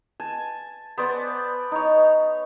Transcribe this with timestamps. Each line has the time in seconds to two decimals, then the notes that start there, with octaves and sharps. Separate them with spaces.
0.20 G#5 A5
0.98 B3 C5 D5
1.72 D#4 C#5